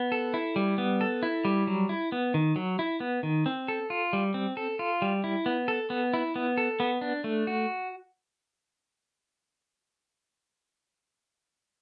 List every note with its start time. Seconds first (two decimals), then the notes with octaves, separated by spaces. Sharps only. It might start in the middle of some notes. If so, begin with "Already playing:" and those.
Already playing: B3
0.12 A4
0.34 E4
0.56 G3
0.78 B3
1.01 A4
1.23 E4
1.45 G3
1.67 F#3
1.89 E4
2.12 B3
2.34 D#3
2.56 F#3
2.79 E4
3.00 B3
3.23 D#3
3.46 C4
3.68 A4
3.90 F4
4.13 G3
4.34 C4
4.57 A4
4.79 F4
5.02 G3
5.24 E4
5.46 B3
5.68 A4
5.90 B3
6.14 E4
6.36 B3
6.58 A4
6.80 B3
7.01 D4
7.24 A3
7.47 F#4